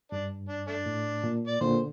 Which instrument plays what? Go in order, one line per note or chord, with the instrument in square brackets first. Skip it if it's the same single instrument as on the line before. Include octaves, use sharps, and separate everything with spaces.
[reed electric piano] G2 [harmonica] D4
[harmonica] D4
A3 D4
[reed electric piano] A2
A#2
[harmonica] D5
[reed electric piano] A#2 D3 [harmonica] C5